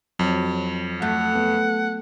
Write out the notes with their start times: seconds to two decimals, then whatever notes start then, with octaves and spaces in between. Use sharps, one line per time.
0.19 F2 F#3
1.02 A3 F#5
1.35 B3